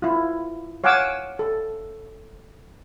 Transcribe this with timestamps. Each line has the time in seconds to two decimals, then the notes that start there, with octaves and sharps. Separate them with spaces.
0.02 E4 F4
0.84 C#5 F5 F#5 G#5 D6 E6
1.39 A4